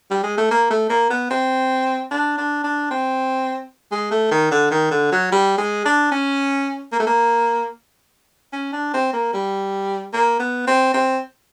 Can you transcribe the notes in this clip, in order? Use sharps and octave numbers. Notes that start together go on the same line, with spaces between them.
G3
G#3
A3
A#3
A3
A#3
B3
C4
D4
D4
D4
C4
G#3
A3
D#3
D3
D#3
D3
F#3
G3
G#3
D4
C#4
A#3
A3
A#3
C#4
D4
C4
A#3
G3
A#3
B3
C4
C4